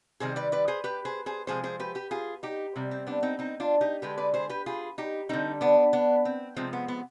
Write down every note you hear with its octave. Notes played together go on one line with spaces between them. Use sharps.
C3 D#3 G3 G#4 C5
B4 D5
B4 D5
G#4 C5
G4 B4
G#4 C5
G#4 C5
C3 F3 G#3 G#4 C5
G#4 C5
G4 B4
G4 B4
F4 G#4
D#4 G4
C3 G3
C4
B3 D4
C4 D#4
C4 D#4
D4 F4
D#4 G4
D3 G#3 G4 B4
B4 D5
G#4 C5
G4 B4
F4 G#4
D#4 G4
D3 G3 C4 D#4
B3 D4
B3 D4
C4
C3 F3 G#3 C4
B3
B3